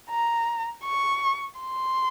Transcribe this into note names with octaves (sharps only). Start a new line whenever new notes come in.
A#5
C#6
C6